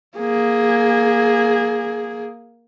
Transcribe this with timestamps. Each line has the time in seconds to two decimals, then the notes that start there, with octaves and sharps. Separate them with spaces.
0.17 A#3 G#4